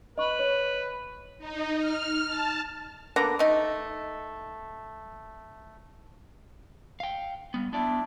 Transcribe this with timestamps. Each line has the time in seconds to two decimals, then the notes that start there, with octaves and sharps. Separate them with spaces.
0.18 B4 D#5 C#6
0.39 C#5
1.39 D#4
1.78 F6
2.27 A5
3.16 D3 A#3 B3 A#5
3.39 A3 D#4
7.00 F5 G5
7.54 G3 B3
7.73 B3 D4 E4 D5